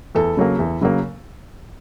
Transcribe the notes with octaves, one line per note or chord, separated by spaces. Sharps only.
E2 A4
C#3 F#3 A#3
E2
C#3 F#3 A#3